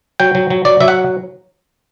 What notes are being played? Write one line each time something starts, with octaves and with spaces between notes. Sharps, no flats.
F#3 G5
F#3
F#3
F#3 D5
F#3 E5
F#5